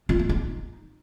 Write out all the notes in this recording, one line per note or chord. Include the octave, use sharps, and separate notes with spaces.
F4
A#3
D#4